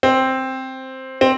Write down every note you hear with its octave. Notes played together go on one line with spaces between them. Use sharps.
C4
C4